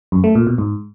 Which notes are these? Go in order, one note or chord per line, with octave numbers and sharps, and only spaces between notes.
F#2
A3
A#2
B2
G#2